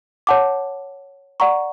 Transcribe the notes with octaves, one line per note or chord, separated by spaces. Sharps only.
C#5 F#5 A5 D6
D5 F#5 A#5 C#6